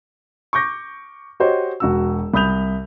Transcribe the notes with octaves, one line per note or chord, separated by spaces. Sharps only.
C#6 D6 G6 A#6
F#4 G4 C5 C#5 D#5
E1 F#4 E6
C2 B5 D#6 G6 F7